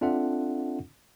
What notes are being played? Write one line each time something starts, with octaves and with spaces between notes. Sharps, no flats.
C4 D4 F4 A4 E5 F#5